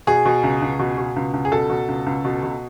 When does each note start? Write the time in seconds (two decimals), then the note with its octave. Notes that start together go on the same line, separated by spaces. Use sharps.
0.07 B2 G#4
0.25 B2
0.43 C#2
0.62 C#2
0.79 B2
0.98 B2
1.16 C#2
1.33 C#2
1.45 G#4
1.51 B2 A4
1.69 B2
1.88 C#2
2.06 C#2
2.25 B2
2.43 B2